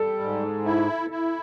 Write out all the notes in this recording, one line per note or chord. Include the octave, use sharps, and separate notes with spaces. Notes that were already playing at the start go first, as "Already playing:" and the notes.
Already playing: G3 A4
G#2
E4
E4